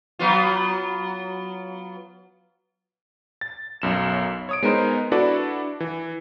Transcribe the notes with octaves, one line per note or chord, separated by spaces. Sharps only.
F#3 B3 F4
A6
B1 F#2 E7
C#5 D#6 D7
G#3 B3 D#4 A#4 C5
D4 E4 F#4 A4 B4 D5
E3